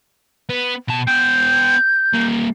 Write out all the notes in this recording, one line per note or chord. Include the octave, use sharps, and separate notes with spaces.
B3
B2 A5
B3 G5 G6
G3 A#3